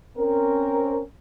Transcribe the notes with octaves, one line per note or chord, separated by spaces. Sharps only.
C4 C#4 A#4